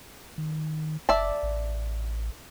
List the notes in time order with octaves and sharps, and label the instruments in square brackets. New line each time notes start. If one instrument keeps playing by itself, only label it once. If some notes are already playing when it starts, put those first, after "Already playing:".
[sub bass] D#3
[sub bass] F#1 [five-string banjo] D5 E5 A5
[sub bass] A1